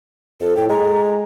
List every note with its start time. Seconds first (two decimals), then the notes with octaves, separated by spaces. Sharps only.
0.40 F2 A4
0.57 A2 G5
0.69 G#3 A#5